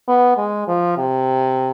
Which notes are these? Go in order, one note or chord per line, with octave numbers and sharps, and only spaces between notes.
B3
G#3
F3
C3